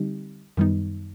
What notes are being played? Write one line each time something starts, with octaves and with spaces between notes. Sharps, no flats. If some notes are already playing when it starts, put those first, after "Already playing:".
Already playing: D3 G3 C4 D#4 G4
F#2 D#3 G3 B3 D#4